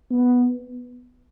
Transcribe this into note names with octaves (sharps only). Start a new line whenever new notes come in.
B3